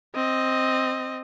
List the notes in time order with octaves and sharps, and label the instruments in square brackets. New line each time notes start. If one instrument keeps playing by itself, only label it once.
[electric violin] C4 D#5